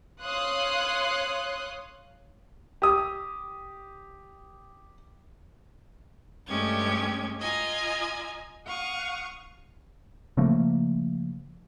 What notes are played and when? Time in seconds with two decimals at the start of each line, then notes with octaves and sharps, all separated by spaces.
0.22 C#5 F5 C6 D#6 F#6
2.82 G4 D#6
6.47 G2 G#3 A3 C#4 G4 G#6
7.40 F4 D#5 G#5 A#5
8.65 F5 F#5 C#6 D#6
10.37 C#3 F3 A3 A#3